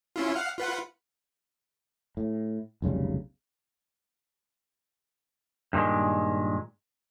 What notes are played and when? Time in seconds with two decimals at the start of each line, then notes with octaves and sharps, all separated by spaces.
0.16 C#4 E4 F4
0.35 F5 F#5 F6
0.58 F4 B4 F#5
2.17 A2
2.82 F1 B1 C#3 G3
5.73 G2 A#2 D#3 G#3